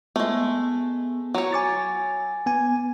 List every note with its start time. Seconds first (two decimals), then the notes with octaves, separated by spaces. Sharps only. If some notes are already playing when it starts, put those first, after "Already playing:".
0.16 G#3 A3 B3
1.34 F#3 C#5
1.53 G#5 D6 A6
2.46 B3 G#5